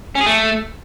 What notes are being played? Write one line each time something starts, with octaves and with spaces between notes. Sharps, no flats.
C#4
G#4
A3